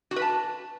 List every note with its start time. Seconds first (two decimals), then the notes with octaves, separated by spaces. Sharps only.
0.11 F#4
0.16 B4
0.22 A5